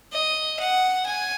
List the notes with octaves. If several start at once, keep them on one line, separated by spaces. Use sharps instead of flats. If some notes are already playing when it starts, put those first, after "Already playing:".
D#5
F#5
G#5